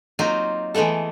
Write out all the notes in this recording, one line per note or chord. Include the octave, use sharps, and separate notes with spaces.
F#3 A#3 C4 D#4 F4
E3 G#3 A3 B3 A4